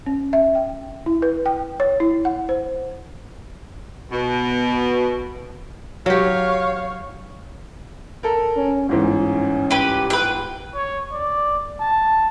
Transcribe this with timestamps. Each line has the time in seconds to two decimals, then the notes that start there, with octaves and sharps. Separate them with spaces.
0.06 C#4
0.33 E5
0.55 G5
1.06 E4
1.22 B4
1.46 G5
1.80 C#5
2.00 E4
2.25 F#5
2.49 C5
4.11 B2
6.06 F#3 G4 C#5 F5
8.23 A4 A#4
8.56 C#4
8.89 G1 G#2 E3 C#4
9.71 G4 B4
10.10 B4 G5
10.75 C#5
11.13 D5
11.80 A5